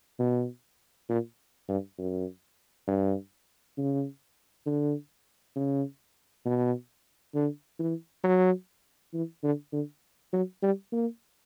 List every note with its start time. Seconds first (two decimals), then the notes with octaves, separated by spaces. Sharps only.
0.19 B2
1.09 A#2
1.68 G2
1.98 F#2
2.87 G2
3.78 C#3
4.66 D3
5.56 C#3
6.45 B2
7.34 D3
7.79 E3
8.24 F#3
9.14 E3
9.43 D3
9.73 D3
10.33 F#3
10.62 G3
10.92 A#3